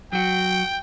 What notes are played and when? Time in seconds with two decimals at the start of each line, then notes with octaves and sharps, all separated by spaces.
0.13 F#3 F#4 G5